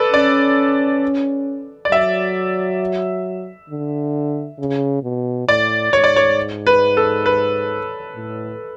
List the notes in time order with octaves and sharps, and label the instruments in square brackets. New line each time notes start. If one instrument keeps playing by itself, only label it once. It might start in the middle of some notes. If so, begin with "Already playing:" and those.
Already playing: [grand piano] A4 B4 D5
[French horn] C#4 [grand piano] D5
[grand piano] D5
[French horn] F#3 [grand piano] E5
[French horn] D3
C#3
B2
[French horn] A2 [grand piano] D5
[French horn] G#2 [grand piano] C#5
[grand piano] D5
C#5
B4
A4
B4
[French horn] A2